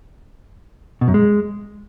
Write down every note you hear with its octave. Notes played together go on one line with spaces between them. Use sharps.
B2
F#2
G#3